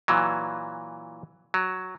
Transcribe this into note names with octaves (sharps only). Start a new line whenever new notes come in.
A#2 E3 F#3
F#3